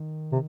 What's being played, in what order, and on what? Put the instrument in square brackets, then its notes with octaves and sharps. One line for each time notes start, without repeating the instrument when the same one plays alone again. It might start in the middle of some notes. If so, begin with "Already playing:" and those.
Already playing: [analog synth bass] D#3
[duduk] C3